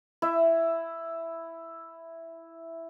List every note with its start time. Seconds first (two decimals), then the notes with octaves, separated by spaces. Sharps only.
0.22 E4 E5